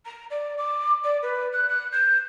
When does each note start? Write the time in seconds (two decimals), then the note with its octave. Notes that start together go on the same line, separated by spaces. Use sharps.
0.05 A#5
0.31 D5
0.58 D6
1.04 D5
1.22 B4
1.52 F#6
1.69 F#6
1.92 G6